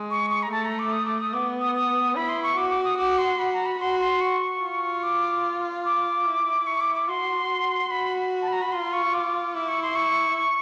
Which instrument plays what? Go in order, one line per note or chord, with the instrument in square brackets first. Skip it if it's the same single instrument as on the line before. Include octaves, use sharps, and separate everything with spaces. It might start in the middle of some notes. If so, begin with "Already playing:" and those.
Already playing: [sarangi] G#3
[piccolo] C#6
C#6
A#5
[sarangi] A3 [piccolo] A5
[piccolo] A#5
D6
D#6
D6
D#6
[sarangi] B3 [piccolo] D6
[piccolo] D#6
D#6
[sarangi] E4 [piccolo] B5
[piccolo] C6
C#6
[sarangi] F#4 [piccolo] D6
[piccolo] D6
D#6
[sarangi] F#4 [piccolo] D6
[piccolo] C6
[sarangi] F#4 [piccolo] B5
[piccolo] A#5
B5
[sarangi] F#4 [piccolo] C6
[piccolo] C6
C#6
[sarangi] F4
[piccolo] D6
D6
[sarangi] E4
[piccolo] C#6
D6
D6
[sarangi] F#4 [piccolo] C6
[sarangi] F#4 [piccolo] B5
[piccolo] A5
B5
A#5
B5
[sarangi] F4 [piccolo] C6
[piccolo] C#6
D6
[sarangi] E4 [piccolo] D6
[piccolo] C#6
C6
C#6